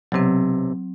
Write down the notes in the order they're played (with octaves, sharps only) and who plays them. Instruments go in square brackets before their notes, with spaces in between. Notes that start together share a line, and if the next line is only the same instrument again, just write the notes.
[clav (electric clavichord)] B1 C3 [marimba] F#3 C4